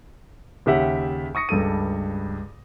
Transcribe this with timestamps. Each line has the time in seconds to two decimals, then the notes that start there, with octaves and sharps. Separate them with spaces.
0.66 D#2 C#3 G4 E5 F#5
1.35 C#6 D#6 A#6 C#7
1.49 C#2 G2 A4 D#7